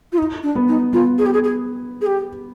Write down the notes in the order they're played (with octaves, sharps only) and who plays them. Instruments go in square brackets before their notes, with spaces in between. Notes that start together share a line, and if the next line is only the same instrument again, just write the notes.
[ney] F4
D#4
D4
[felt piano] B3
[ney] D#4
[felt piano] B3 [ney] F4
[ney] G#4
G4
G#4
G#4
G#4
G4